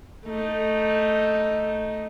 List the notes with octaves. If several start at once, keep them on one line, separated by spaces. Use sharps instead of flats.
A3 D#4